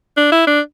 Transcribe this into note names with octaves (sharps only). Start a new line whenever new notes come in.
D4
E4
D4